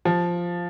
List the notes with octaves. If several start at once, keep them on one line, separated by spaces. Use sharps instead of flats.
F3